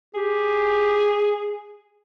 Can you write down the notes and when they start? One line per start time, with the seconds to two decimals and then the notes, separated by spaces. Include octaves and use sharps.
0.15 G4 G#4